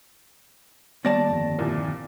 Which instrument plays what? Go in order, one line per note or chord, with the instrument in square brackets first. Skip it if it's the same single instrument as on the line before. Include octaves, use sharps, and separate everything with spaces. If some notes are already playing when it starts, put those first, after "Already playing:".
[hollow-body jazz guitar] D#2 D5 A5 [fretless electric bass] G3 B3 [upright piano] A6 A#6
[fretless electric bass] G1 F2
[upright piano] C2 A#2